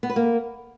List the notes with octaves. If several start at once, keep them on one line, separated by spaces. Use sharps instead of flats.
B3
B4
A#3